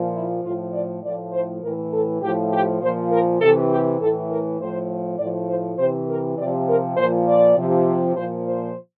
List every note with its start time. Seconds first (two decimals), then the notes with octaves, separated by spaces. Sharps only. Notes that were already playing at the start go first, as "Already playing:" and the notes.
Already playing: A#2 F3
0.14 E4
0.45 A2 F3 F4
0.73 D5
1.03 A2 F3 D5
1.33 C5
1.62 A2 E3 A#4
1.92 A4
2.22 A2 F3 G4
2.52 G4
2.82 A#2 F3 C5
3.11 A#4
3.41 C3 E3 A4
3.71 G4
4.00 A2 E3 A4
4.30 A#4
4.60 A2 F3 C5
5.19 A2 F3 D5
5.48 C5
5.78 C3 E3 C5
6.09 A#4
6.38 C3 F3 D5
6.67 A#4
6.97 A#2 F3 C5
7.28 D5
7.57 C3 F3
8.16 A#2 F3 C5
8.46 C5